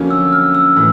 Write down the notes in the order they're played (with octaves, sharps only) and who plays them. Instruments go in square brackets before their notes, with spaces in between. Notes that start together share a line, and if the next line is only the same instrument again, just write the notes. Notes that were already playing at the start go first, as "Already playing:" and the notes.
Already playing: [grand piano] F2 D3 F#3 A#3 C#4
[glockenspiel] E6
F6
E6
[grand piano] A2 E3